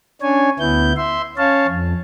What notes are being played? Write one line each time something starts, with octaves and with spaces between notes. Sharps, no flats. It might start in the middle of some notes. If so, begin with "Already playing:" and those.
C#4 D4 C#5 G#5
D2 B3 E4 G6
E5 C6
C#4 C#5 F5 A5
F2